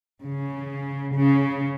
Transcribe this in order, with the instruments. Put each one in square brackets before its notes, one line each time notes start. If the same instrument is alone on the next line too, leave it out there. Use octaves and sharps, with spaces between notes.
[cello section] C#3
C#3